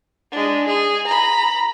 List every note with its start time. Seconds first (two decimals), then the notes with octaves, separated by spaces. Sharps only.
0.32 G#3 D4
0.68 G#4
1.07 A#5 B5